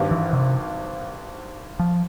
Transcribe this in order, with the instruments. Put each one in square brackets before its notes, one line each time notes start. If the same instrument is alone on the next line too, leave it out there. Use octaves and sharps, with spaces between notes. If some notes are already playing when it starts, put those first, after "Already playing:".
Already playing: [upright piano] G#1 G2 G3
[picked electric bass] E3
C3
F3